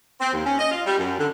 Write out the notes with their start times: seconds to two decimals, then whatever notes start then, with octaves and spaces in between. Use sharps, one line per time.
0.20 C4
0.32 D#2
0.45 C#4
0.59 D#5
0.71 F4
0.85 G3
0.98 F#2
1.18 D3